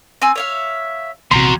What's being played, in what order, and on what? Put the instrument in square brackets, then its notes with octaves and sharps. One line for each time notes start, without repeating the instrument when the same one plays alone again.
[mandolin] C4 G#5 E6
C#5 E5 F5
[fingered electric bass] A#1 C3 [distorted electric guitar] E2 [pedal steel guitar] F#4 A#5 C6